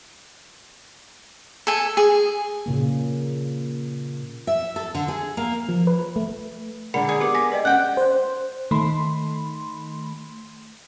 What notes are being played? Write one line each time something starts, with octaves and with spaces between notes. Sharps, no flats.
A4 G#5
G#4
A#2 C#3 A#3
E5
A4
D3
G#4
A#3
F3
B4
A3
D3 G#3 A#4 D5 F#5 B5 C#7
G#4
B3 G4 B4 D6 C#7
G#5 A#6 B6
B4 D5 D#5 G5
G#3 C#4 F#5 G5
C5
D#3 A3 B5 C6